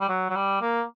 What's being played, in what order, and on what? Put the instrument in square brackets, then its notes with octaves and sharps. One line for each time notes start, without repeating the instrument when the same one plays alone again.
[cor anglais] G3
F#3
F#3
G3
A#3